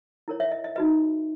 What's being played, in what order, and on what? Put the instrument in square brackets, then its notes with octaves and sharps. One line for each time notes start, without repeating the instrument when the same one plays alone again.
[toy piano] E4 A#4 C#5
C#5 E5
D#5
D#5
D#4 F#4 B4 D#5